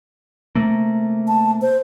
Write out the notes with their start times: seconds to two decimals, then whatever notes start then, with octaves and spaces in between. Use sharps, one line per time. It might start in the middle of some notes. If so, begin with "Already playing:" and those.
0.55 C3 A3 A#3
1.28 A5
1.62 C5